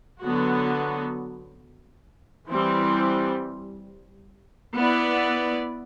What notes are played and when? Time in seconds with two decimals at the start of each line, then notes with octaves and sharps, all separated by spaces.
0.23 D3 F#3 B3 F#4
2.49 E3 G3 C4
4.76 B3 E4 B4 D5